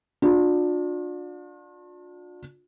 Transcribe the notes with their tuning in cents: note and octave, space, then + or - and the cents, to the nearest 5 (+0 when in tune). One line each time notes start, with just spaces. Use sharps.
D4 +10 F4 +45